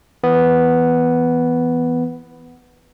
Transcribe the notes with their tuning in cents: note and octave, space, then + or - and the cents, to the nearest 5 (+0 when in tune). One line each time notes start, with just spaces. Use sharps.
E3 +0 B3 +0